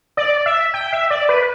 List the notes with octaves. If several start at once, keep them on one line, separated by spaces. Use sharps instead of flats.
D5
E5
G5
E5
D5
B4